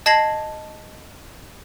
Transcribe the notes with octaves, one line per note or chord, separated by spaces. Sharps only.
D#5 A5 G#6 A#6 C7 F#7